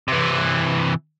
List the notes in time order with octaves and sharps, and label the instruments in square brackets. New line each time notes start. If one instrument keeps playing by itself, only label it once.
[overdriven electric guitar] C3 E3